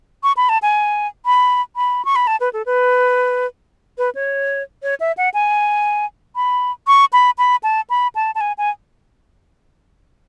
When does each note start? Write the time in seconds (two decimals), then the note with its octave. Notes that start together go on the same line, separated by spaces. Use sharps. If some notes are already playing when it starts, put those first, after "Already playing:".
0.23 C#6
0.37 B5
0.49 A5
0.62 G#5
1.26 B5
1.76 B5
2.05 C#6
2.16 B5
2.27 A5
2.40 B4
2.53 A4
2.66 B4
3.98 B4
4.15 C#5
4.83 C#5
5.00 E5
5.17 F#5
5.34 G#5
6.36 B5
6.87 C#6
7.13 B5
7.38 B5
7.63 A5
7.90 B5
8.15 A5
8.35 A5
8.41 G#5
8.58 G#5